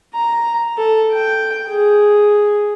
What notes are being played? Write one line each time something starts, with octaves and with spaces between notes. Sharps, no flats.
A#5
A4
G5
G#4